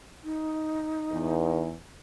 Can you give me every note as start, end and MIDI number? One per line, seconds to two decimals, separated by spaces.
0.24 1.62 63
1.11 1.73 40